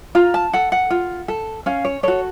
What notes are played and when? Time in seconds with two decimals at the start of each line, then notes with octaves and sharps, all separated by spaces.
0.15 F4 A#5
0.34 A5
0.53 A4 F#5
0.72 F#5
0.90 F4
1.28 A4
1.66 C#4 F5
1.85 C#5
2.03 F#4 A4 C#5